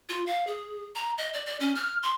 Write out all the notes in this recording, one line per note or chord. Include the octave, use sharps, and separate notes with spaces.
F4
F5
G#4
A#5
D#5
D5
D5
C#4
F6
C6